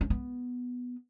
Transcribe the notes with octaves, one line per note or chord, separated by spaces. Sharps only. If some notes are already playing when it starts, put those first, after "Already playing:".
C#4
B3